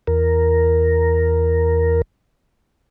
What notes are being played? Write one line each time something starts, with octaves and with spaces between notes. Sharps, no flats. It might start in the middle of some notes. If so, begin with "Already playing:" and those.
E2 A#4